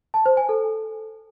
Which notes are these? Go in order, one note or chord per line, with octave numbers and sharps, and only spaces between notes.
A5
C5
G#5
A4